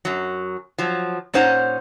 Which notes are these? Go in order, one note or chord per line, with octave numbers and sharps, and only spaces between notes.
F#2 F#3
F3 F#3
A#2 C#4 D#4 C5 F#5 A#5